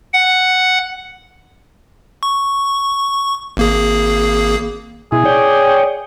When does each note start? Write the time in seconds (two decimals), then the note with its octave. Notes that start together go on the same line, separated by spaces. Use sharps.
0.14 F#5
2.23 C#6
3.57 G#1 A#3 G#4
5.12 B2 E4 G#4
5.25 C#5 D5 G5